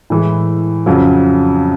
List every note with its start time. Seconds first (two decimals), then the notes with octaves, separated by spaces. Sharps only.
0.10 A2 E3 G#3
0.86 F2 C#3 F#3